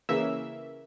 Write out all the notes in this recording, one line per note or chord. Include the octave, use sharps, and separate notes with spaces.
C#3 E3 A#3 E5